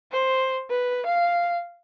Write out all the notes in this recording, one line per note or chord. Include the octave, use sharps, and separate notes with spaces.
C5
B4
F5